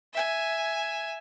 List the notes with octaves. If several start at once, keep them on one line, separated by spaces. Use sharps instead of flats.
E5 G#5